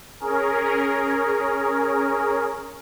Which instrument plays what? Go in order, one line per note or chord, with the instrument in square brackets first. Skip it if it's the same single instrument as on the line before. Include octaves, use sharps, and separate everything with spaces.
[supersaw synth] C#4 G#4 A#4